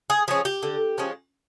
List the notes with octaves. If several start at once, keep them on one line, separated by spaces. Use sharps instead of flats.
G#4
F3 G#3 C#4 G#4
G4
D3
F3 G#3 C#4